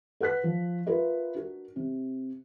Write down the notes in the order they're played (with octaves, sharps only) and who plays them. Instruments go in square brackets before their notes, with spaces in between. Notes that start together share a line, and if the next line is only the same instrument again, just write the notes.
[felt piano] B4 F#5 F#6 B6
F3
F4 A#4 B4 E5
D4 F#4 A#4
C3